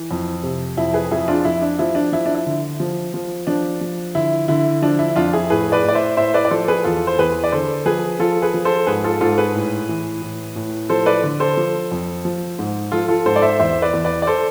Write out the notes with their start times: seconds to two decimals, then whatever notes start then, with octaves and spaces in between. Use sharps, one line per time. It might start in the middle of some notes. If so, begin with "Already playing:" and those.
Already playing: E3
0.11 F2
0.43 C3
0.77 F2 E4
0.94 G#4 B4
1.11 F2 E4 G#4
1.28 D4 F4
1.45 F2 E4
1.62 D4
1.79 F3 E4
1.95 D4
2.12 F3 E4
2.26 D4
2.35 E4
2.46 D3
2.80 F3
3.14 F3
3.47 F3 D4
3.81 F3
4.15 D3 E4
4.48 D3 E4
4.82 F3 D4
4.99 E4
5.16 F2 D4 F4
5.33 E4 G#4
5.50 A2 G#4 B4
5.72 B4 D5
5.83 A2
5.89 D5
5.95 C5 E5
6.17 A2 C5 E5
6.34 B4 D5
6.45 D5
6.51 F3 A4 C5
6.68 G#4 B4
6.84 E2 F4 A4
7.07 C5
7.18 E2 G#4 B4
7.44 D5
7.52 D3 A4 C5
7.86 F3 G#4 B4
8.19 F3 F4 A4
8.42 G#4 B4
8.54 F3
8.65 A4 C5
8.87 G#2 G#4 B4
9.04 F4 A4
9.21 G#2 F4 A4
9.38 G#4 B4
9.55 A2
9.89 E3
10.22 A2
10.56 A2
10.89 F3 A4 C5
11.06 B4 D5
11.23 D3
11.40 A4 C5
11.57 F3
11.91 F2
12.25 F3
12.59 G#2
12.92 F3 F4 A4
13.08 F4 A4
13.26 G#2 A4 C5
13.36 D5
13.42 C5 E5
13.59 E2 C5 E5
13.82 B4 D5
13.93 E2
14.04 B4 D5
14.22 D5
14.27 A4 C5